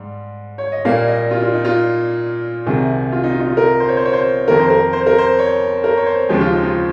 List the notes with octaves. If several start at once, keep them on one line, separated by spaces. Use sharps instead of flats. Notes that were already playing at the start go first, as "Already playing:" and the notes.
Already playing: G#2 G3
C#5
D#5
A#2 G3 A#3 F5
D#5
F4
F4
D#4
F4
C2 C3 D#3 G#4
F4
D#4
F4
D#4
F4
A#4
C5
C#5
C5
C#5
C5
F2 D#3 A#3 A#4
C5
A#4
C5
A#4
C5
C#5
A#4
C#5
C5
D#2 C#3 F3 G#3 G4
F4
D#4
F4